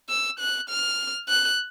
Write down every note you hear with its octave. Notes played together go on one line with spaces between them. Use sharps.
E6
F#6
F6
F#6